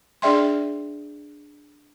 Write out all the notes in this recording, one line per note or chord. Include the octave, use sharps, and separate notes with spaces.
D4 G#4 D5 E5 G5 C6